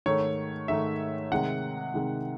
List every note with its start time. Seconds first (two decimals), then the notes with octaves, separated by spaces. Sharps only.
0.06 G#2 D#3 A3 C#5
0.68 G#2 D#3 A3 E5
1.31 C3 D#3 G#3 F#5
1.94 C3 D#3 G#3